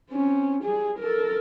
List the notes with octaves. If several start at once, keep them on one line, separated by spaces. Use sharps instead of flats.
C4 C#4
G3 G#4
A4 A#4